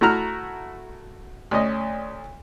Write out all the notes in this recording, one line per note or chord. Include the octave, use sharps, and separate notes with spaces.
A3 E4 F#4 A#5 F6
D2 C#4 D#5